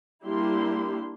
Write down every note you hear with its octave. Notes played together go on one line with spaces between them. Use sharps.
G3 A#3 D4 E4 G4 C6